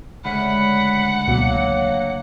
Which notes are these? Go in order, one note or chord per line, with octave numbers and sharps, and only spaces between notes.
D2 C#3 G#3 F#5 B5
C#2 B2 F#3 A#3